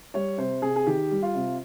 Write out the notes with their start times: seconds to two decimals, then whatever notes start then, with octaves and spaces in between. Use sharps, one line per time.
0.14 G3 C#5
0.38 C3 C5
0.62 C3 G#4
0.76 G#4
0.86 D#3 G4
1.10 G3
1.22 F4
1.34 C3